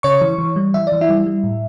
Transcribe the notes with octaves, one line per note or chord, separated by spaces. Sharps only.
C#3 C#5 C#6
E3
E3
G3
E3 E5
D5
E3
E4 E5
G3
G3
A2